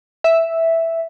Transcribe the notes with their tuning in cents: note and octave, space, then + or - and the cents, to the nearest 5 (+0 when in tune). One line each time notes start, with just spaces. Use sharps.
E5 +0